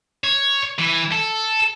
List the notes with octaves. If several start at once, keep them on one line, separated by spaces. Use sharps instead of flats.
C#5
E3
A4